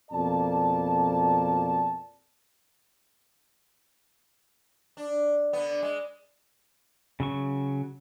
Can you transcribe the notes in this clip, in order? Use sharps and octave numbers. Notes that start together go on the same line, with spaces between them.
F2 B2 A#3 D5 A5
D4
D3 B3
G#3
C#3 F#3 C#6